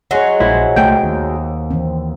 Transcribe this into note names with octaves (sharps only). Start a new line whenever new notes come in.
F#3 G#3 C#5 F#5
A#1 E4 C5
C2 A3 G5
D#2
E3 C4